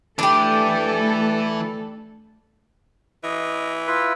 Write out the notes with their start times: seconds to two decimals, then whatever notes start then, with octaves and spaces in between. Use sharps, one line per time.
0.19 E3 A3 D4 E4 G4 A4
3.24 E3 D#5
3.87 E4 F4 B4